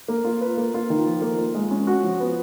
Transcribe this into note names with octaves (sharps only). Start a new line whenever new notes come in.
A#3
F4
B4
A#3
F4
D#3
F3
A#3
F4
G#3
C#4
F#4
F3
B3